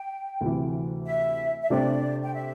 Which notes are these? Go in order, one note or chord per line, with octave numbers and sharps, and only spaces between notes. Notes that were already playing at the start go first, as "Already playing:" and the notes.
Already playing: G5
D2 C3 E3
E5
E5
C3 A3 D4 G4 C5 D5
G5
E5